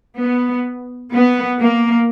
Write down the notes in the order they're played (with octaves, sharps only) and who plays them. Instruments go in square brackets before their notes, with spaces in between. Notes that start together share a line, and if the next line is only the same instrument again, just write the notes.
[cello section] B3
B3
A#3